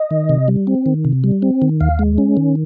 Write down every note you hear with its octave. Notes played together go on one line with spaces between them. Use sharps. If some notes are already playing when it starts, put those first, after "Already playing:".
Already playing: D#5
D#3
C3
G3
C4
D#3
C3
G3
C4
D#3
D#2 F5
G#3
C#4
D#3